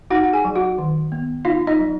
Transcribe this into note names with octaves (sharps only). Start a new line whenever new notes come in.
D#4 F#4 F#5
F#5
G#4 G#5
F#3
F#4 F#5
D#3
B3
D#4 F4 F5
D#4 D#5
F#3